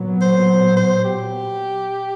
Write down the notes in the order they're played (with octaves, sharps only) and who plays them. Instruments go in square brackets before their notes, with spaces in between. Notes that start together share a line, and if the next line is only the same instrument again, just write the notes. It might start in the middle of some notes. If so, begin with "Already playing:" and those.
Already playing: [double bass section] A#2 F#3 B3
[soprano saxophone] C5
C5
G4